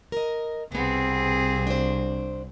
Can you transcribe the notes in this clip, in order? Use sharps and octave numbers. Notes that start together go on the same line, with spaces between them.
A#4 D#5
C2 B2 B3 C4 G#4
D4 C5